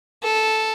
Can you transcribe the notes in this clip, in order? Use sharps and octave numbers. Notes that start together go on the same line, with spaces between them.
A4